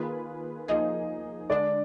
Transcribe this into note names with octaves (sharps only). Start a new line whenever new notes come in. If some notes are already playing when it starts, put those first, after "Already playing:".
Already playing: D#3 A#3 F4 G#4 B4
F3 A#3 D#4 G#4 D#5
D3 G#3 D4 D5